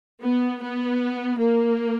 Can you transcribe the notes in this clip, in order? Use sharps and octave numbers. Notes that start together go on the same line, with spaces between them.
B3
B3
A#3